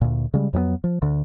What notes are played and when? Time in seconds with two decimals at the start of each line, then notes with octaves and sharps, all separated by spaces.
0.01 D2 A#2
0.34 C#3 G3 G#3
0.53 F2 F#3 G#3 B3
0.84 F3
1.02 D2 D3